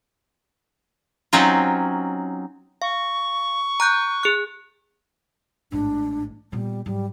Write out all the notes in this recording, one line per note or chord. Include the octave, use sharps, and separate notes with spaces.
F#3 C4 C#4 D#4 F4
F5 C#6
A#5 F#6 G6
G#4 F#6
A1 G#2 D4
A#2 G3 B3
G#2 F#3 G3